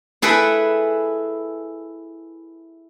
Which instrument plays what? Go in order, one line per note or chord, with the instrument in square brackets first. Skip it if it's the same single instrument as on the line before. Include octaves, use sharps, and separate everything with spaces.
[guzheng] E4 G#4 A4 B4 G5